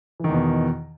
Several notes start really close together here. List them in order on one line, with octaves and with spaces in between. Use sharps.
E3 D#3 E2 B2